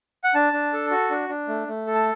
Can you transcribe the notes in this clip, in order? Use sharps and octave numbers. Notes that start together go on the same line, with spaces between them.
F#5
D4 A5
D4
A4
F#4
D4
D4
A3
A3
A4
A5